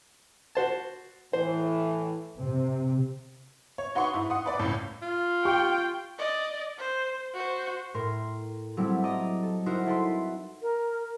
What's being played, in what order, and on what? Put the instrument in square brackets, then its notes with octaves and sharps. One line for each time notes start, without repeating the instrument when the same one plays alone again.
[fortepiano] F#4 C5 A5
[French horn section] A2 E3 [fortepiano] C5
[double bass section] C3
[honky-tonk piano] C#5
D#4 F#4 B4 F#5 C6 C#6
G#2 E4
F#5 C6 D#6
B4 D5 D6
C#2 A2
[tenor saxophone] F4
[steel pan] G4 [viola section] G5 [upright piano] C#6
[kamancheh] D5 D#5
C5
F#4 C5
[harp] A2 A#4 C6
F#3 G3 A3 C4 E4
D5 D#5 A#5
A4
D#4 E4 F#4 A#4 C5
E4 A4 B4 C6
[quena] A#4